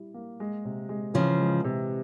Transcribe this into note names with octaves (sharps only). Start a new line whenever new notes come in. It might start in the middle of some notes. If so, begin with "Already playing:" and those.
Already playing: G3 E4
A#3
G#3
C3
G#3
C#3 E3 F3
G#3
C3